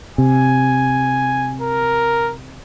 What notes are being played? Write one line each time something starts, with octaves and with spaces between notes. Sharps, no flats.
C3 G#5
A#4